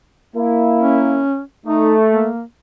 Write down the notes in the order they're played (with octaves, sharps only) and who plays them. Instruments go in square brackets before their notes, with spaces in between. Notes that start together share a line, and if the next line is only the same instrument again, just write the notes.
[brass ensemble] A#3 E4
[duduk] C#4
[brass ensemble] A3 [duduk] D#4
[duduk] A#3